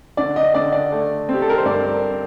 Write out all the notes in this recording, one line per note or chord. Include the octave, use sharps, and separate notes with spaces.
D3 D5
D#5
D3 D5
D5
A3
C4
G4
A4
A#4
C5
G2 D5